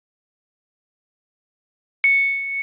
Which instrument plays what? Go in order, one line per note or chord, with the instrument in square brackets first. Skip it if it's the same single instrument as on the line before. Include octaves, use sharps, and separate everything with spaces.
[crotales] C#7